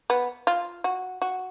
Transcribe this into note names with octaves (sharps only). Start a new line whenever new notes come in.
B3
F4
F#4
F#4